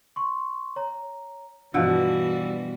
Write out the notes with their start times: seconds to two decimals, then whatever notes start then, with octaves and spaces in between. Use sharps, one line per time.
0.16 C6 C#6
0.76 C#5 A#5
1.74 G2 B2 E3 F3 G3 F#4 E6